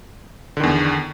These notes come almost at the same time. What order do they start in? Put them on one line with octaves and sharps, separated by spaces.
D3 D#3 E2